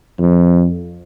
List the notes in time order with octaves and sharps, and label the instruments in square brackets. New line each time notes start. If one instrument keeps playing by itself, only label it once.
[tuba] F2